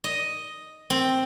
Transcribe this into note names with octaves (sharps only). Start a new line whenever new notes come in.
D#5
C4